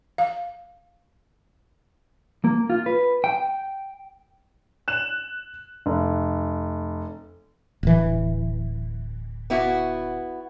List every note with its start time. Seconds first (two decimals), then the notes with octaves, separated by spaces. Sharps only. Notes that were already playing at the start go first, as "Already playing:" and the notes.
0.18 F5
2.44 A#3
2.70 F4
2.86 B4
3.24 G5
4.88 F#6 E7
5.86 F1
7.83 D1 E3
9.50 B3 E4 F#4